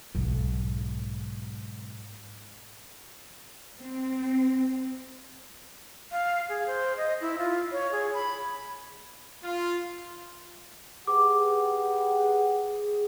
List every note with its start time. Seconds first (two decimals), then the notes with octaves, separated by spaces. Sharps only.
0.15 B1 G#2
3.79 C4
6.12 F5
6.49 G#4
6.67 C5
6.97 D#5
7.21 E4
7.38 F4
7.72 C#5
7.92 G#4
8.14 B5
9.44 F4
11.07 G4 G#4 B4 F#5 D6